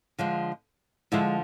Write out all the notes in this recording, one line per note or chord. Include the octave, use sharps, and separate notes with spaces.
D3 F3 G#3
D3 F3 G#3 E4